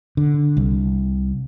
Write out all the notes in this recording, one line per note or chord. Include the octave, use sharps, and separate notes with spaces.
D3
C2